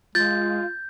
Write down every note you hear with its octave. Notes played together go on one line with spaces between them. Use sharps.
G#3 F4 G6 A6